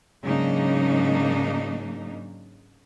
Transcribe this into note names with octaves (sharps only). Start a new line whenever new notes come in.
G#2 C#3 F#3 A#3 D4 D#4